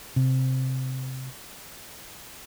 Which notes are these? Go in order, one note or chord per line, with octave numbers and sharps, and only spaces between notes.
C3